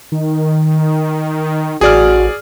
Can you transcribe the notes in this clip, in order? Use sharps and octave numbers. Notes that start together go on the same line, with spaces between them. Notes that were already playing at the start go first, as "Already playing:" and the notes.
D#3
A1 F#4 G#4 D5 F6